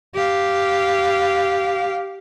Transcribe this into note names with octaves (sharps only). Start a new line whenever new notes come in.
G4 F5